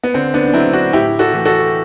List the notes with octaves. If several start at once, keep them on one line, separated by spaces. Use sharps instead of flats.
B3
D3 C4
B3 D4
D4
F#3 A3 C4 E4
D4 F#4
A2 E4 G4
F#4 A4
E3 A3
F#4 A4